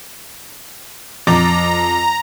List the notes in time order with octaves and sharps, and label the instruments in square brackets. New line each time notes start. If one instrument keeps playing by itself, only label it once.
[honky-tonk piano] F2 D6 A6 [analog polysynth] A#5